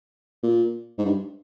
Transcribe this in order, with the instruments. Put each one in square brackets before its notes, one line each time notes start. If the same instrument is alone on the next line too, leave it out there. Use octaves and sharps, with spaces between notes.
[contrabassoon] A#2
G#2
G2